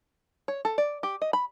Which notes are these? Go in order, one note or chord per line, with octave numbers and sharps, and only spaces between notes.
C#5
A4
D5
G4
D#5
B5